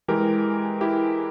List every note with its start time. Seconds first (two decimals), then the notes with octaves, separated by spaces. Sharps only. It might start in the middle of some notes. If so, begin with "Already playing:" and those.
0.08 E3 G#3 G4 A#4
0.81 E4 G4